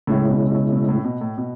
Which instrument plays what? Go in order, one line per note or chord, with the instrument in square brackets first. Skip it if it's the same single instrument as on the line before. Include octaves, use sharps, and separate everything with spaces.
[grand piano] A2 [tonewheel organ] C#3 G#3 C#4 E4
[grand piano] B2
B2
B2
A2
B2
A2
B2